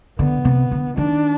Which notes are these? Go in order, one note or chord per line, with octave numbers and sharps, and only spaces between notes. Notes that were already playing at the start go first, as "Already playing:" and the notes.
D3 B3
C3
D3
D#3 D4